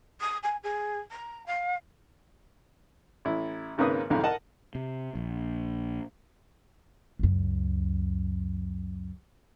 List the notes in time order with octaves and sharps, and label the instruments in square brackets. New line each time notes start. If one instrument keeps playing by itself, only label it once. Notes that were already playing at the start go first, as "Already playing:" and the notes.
[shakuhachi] D#6
G#5
G#4
A#5
F5
[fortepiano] A1 E4
G#1 G#2 C#3 A#3 B4 D#6
B1 F2 G#2 D3 E4 F5
A#4 D#5 F#5 A5
[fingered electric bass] C3
A#1
[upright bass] C#2 F#2